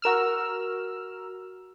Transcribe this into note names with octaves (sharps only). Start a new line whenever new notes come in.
F#4 A#4 E6 F6